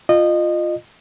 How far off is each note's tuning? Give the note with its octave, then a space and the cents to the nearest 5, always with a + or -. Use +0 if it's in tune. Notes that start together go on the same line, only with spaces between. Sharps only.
F4 +0 D#5 -25